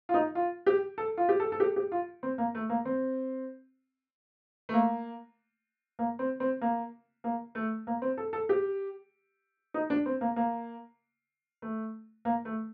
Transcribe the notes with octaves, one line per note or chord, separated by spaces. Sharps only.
F4
D#4
F4
G4
A4
F4
G4
A4
A4
G4
G4
F4
C4
A#3
A3
A#3
C4
A3
A#3
A#3
C4
C4
A#3
A#3
A3
A#3
C4
A4
A4
G4
D#4
D4
C4
A#3
A#3
A3
A#3
A3